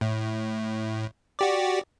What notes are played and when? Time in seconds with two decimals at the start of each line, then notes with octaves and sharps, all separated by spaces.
0.01 A2
1.39 F#4 G4 D5